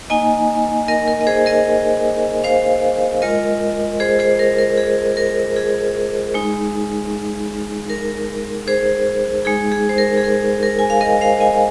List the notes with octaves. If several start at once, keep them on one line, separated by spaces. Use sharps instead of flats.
A#3 D#4 D#5 G#5
A#4 D#5
A#4
D#5
G#4 C5
A#4 D#5
C5 F5
G#3 F4 A#4 D#5
G#4 C5
G#4 C5
A#4
A#4
G#4
A#4
G#4
G#3 D#4
A#4
G#4 C5
G#3 D#4 G#4
G#4
C5
A#4
G#4
A#4
A#4
G#5
F5
A#4 D#5
C5 F5
D#5 G#5